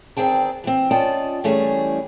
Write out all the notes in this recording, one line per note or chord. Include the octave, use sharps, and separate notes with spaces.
E2 D#3 C4 G#4 G5 A5
E3 C4
C#4 F4 D5 D#5 G5 A5
E3 G3 A3 C#4 G#4